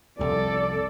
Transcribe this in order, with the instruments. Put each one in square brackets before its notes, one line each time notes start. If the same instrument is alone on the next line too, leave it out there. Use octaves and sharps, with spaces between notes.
[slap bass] C2 F2 [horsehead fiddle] A4 D5